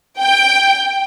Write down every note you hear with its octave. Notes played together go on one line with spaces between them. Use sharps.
G5